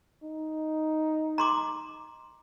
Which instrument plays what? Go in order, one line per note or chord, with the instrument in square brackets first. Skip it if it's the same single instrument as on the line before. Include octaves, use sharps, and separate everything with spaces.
[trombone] D#4
[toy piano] A#5 C6 D6